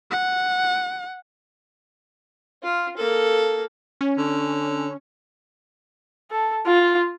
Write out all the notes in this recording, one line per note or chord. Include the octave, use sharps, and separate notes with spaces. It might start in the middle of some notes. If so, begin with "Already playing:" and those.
F#5
F4
A#3 A4
C#4
D3
A4
F4